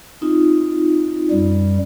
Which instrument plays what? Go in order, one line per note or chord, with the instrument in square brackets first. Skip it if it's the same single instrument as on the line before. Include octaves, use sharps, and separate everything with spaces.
[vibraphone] C4 D#4 F4
[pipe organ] F#2 G3